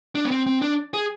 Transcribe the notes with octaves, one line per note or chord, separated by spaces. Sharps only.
D4
B3
C4
C4
D4
G#4